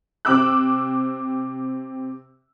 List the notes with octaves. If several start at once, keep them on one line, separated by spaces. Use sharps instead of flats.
C3 C4 D6 E6 F#6